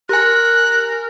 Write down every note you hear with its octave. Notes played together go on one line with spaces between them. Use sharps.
G4 A#4 G#5 F#6